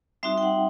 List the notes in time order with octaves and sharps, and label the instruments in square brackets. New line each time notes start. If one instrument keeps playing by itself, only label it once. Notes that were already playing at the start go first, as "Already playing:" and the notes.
[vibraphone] G3 C4 D#4 F#4 E5
G5
F#5